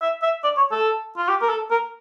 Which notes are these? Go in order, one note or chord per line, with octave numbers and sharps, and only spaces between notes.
E5
E5
D5
C#5
A4
F4
G4
A#4
A4
A#4